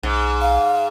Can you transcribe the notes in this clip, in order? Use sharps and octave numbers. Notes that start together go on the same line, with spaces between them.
B1 G#2
F5